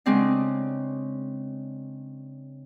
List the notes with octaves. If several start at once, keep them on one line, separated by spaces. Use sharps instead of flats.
C#3 G#3 C4 D4